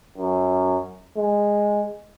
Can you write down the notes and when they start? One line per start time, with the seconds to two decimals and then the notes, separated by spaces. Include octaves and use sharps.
0.17 F#2
1.17 G#3